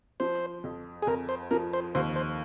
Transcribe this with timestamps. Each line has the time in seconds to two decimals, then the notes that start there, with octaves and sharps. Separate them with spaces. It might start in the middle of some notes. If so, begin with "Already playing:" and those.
0.20 F3 C5
0.64 F2
1.02 G#4
1.07 F2 A#4
1.29 C5
1.51 F3 A#4
1.73 C5
1.95 D#2 C5
2.16 C5